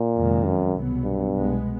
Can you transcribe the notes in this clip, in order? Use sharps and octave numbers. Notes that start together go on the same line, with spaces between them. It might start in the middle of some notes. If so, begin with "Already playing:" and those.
Already playing: A#2
F2 C3 D#3 G#3
F#2
C2 B2 F#3 B3
G2
C2 B2 G#3 B3